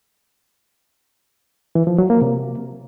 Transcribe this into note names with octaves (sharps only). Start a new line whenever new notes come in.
E3
F3
F#3
A#3
C3